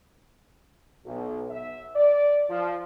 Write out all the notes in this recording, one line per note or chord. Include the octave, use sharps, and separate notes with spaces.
B1
E5
D5
F3